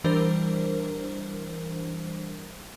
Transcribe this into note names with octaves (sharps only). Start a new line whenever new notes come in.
E3 G3 D4 A#4 C5